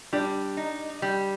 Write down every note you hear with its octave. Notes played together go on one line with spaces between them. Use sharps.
G3 D4
D#4
G3